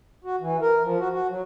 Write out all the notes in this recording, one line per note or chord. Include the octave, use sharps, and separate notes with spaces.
F#4
E3
A#4
F3
F#4
F#4
F#3